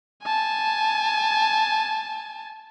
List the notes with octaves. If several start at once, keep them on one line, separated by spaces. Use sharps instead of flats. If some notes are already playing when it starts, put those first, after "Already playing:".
G#5 A5